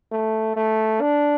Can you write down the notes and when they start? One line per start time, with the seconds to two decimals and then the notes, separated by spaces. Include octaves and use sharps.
0.11 A3
0.56 A3
1.01 D4